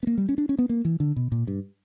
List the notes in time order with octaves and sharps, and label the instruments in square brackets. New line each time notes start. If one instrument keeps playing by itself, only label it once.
[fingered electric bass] B3
A#3
G3
C#4
D4
C#4
B3
A#3
E3
D3
B2
A#2
G2